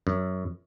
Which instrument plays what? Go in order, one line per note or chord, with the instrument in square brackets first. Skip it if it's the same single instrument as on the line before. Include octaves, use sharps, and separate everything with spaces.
[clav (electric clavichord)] F#2